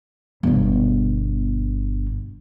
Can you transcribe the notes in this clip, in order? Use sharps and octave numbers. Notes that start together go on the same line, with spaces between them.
G1 B2